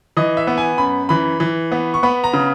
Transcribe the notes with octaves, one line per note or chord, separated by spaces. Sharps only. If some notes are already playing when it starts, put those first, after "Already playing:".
E3 D#5
E5
B3
G#5
F#2 B5
E3 B5
E3
B3
C#6
B3 B5
A#5
C#3